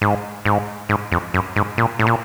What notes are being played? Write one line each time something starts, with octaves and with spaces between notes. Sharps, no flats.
G#2
G#2
G#2
F2
F#2
G#2
A#2
A2
A#2